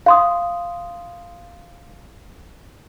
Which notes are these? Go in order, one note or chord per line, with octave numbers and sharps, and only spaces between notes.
F5 C6 D#6